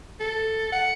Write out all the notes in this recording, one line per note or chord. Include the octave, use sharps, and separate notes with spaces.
A4
F#5